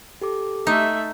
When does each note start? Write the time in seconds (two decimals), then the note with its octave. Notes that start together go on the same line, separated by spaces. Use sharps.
0.21 G4 A4 D6
0.67 A3 D#4 E5